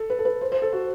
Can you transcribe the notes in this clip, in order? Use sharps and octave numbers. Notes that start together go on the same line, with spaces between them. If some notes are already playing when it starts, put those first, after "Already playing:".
Already playing: A4
B4
A4
B4
C5
C5
A4
F#4